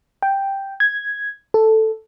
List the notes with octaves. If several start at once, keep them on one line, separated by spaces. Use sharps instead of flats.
G5
G#6
A4